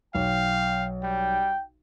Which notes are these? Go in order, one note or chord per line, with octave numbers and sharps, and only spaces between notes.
B1 F5 G5
G3 G5